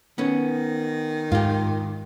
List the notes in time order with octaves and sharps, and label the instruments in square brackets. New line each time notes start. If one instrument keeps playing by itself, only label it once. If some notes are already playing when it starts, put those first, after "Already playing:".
[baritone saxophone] D#3 [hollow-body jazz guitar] B3 C#4
[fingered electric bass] G#2 [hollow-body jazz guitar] F4 G4